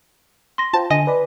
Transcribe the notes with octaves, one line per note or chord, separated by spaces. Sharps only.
C6 A#6
F4 C5 G5 A5
D3 D#5 G#5
B4 D5 B5